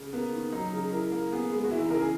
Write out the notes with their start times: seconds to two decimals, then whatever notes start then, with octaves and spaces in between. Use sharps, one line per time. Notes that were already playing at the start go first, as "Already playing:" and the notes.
Already playing: C#3
0.13 A#3 B3
0.32 D#3
0.52 F#3 D#4
0.73 C#3
0.92 E4 A#4
1.12 A#3
1.32 B3 G#4
1.52 G#3
1.64 F#4
1.71 E3 E4
1.81 D#4
1.91 C#3 A#4
2.01 G#4